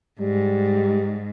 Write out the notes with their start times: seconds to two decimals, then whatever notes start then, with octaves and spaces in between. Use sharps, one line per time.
0.21 G#2 G3